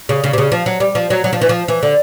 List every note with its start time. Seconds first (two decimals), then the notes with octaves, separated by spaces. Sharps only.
0.09 C#3
0.24 C#3
0.33 C3
0.38 C#3
0.52 F3
0.66 F#3
0.80 G3
0.95 F3
1.10 F#3
1.24 F#3
1.33 F3
1.41 E3
1.49 F3
1.68 E3
1.83 D3